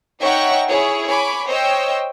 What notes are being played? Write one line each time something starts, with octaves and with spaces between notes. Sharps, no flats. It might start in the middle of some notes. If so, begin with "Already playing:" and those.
D#4 C#5 E5 F#5 G5 C#6
E4 G#4 C#5
C#5 G#5 B5 D6
C5 C#5 D#5 G5 E6